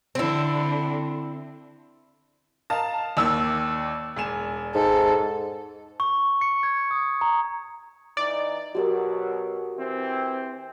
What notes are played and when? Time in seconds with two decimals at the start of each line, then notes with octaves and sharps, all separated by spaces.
0.15 D3 C4 E4
2.70 A#4 D#5 F5 A5
3.17 D#2 D#3 D5 E6
4.16 E1 G#5 E7
4.75 G#2 A4
6.00 C#6
6.41 C#7
6.63 G#6
6.91 D#6
7.21 A#5
8.17 E3 D#4 D5
8.75 B2 F#3 F#4 G4 A#4
9.77 E3 C4